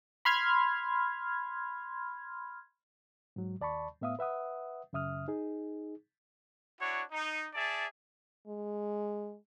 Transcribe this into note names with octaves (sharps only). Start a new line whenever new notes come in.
B5 C6 F6 G#6
G#2 F#3
D#2 D5 A5 B5 C#6
A2 B3 E5 F5 D#6
B4 E5 F#5 D#6
F#2 C#3 E5 D#6 F6
D#4 G#4
D4 E4 F#4 C#5
D#4
G#4 D5 E5 A5
G#3